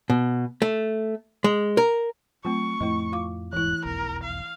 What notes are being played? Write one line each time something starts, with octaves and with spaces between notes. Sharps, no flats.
B2
A3
G#3
A#4
F#3 A3 C4 F4 C#6
F2 A2 F3 A3 E4 D#5
F4 F5 D6
D#1 E2 G#2 E3 E4 F#6
F1 B1 E2 A#4
F5